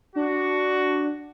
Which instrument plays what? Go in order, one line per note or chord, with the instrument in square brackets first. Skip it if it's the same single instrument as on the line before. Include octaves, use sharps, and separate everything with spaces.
[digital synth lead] D4 [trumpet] F#4